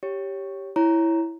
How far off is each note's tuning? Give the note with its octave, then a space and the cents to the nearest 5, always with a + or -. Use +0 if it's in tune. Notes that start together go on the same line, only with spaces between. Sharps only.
G4 +0 C#5 +0
E4 +0 C#5 +0 A#5 +0